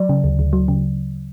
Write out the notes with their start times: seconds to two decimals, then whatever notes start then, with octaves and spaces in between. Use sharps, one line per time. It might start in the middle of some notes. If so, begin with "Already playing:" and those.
Already playing: F#3 D5
0.09 C#3
0.24 D2
0.39 D2
0.53 F#3
0.68 C#3